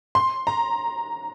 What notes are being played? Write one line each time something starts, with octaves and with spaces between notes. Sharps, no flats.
C6
A#5